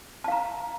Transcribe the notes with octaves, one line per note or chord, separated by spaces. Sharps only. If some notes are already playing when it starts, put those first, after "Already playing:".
F5 A5 A#5